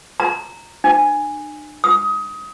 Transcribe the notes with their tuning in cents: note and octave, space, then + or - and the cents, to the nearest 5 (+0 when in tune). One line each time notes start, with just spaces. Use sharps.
A#5 -15
D4 +45
D#6 +25